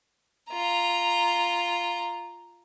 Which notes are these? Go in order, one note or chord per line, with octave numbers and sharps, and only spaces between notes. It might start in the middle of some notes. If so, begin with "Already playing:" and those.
F4 A#5